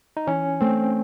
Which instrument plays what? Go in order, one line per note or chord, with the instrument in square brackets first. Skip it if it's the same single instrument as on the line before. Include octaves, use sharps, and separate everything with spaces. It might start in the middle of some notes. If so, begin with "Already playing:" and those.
[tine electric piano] D#4
[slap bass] E3 [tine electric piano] C#4
[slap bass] A3 [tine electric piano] C4